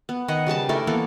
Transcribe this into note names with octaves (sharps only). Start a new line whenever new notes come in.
B3
D#3 D#5 F#5
C#3 G3 B4 A5
A3 D4 E4 A#4
E3 A#3 B3 A4